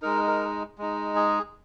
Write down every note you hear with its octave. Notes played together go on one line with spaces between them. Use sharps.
G#3 D#4 A#4
A#4
G#3 D#4
G#4